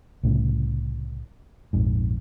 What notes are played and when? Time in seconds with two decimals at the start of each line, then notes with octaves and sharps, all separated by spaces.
0.23 C2 A2 C#3
1.73 A#1 F2 G#2